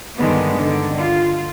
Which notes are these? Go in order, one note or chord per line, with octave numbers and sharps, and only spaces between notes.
G2 D3 D#3 G#3 B3
D3 D#3
F4